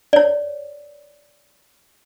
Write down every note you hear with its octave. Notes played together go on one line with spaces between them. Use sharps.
C#5 D5